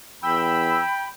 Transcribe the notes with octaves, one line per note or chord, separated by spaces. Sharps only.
E2 G5 B5 E6